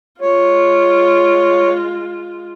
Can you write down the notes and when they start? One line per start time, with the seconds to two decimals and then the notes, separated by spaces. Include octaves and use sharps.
0.21 G#3 F4 C#5